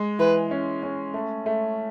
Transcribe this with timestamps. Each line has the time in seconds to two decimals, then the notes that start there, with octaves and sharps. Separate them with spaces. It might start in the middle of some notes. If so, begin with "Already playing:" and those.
Already playing: G#3
0.19 E3 B4
0.51 C#4
0.83 C#4
1.14 A3
1.46 A3